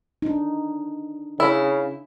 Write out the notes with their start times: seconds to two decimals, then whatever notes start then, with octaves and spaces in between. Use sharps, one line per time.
0.22 D4 D#4
1.40 C#3 E4